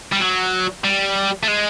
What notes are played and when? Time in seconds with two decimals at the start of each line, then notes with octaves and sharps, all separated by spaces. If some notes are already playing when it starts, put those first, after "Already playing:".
0.12 G3
0.20 F#3
0.84 G3
1.43 A3
1.48 G#3